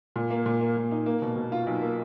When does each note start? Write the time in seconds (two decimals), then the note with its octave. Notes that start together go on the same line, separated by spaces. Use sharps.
0.16 A#2
0.30 A#3
0.46 A#2
0.61 A#3
0.77 A#2
0.91 D#4
1.06 A#3
1.22 B2
1.36 B2
1.52 F4
1.67 B1
1.81 A#3